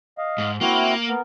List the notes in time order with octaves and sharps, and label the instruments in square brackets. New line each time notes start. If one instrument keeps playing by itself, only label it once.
[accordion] D#5 F5
[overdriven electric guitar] G#2
[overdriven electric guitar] A#3 [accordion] C4 E4 F#4
[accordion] B3 A#4